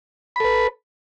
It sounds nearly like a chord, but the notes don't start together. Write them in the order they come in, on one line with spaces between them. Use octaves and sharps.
B5 A4 B4